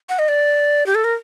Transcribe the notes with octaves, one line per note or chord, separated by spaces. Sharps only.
F#5
D#5
D5
G4
A4
A#4